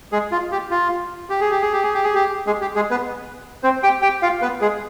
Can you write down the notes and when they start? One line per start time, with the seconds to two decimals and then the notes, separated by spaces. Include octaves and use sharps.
0.12 G#3 G#4
0.32 F4
0.52 G4
0.71 F4
1.30 G4
1.40 G#4
1.51 G4
1.62 G#4
1.73 G4
1.83 G#4
1.94 G4
2.04 G#4
2.15 G4
2.47 G#3 G#4
2.61 G4
2.76 G#3 G#4
2.91 B3 B4
3.63 C4 C5
3.83 G4 G5
4.02 G4 G5
4.22 F4 F5
4.42 B3 B4
4.61 G#3 G#4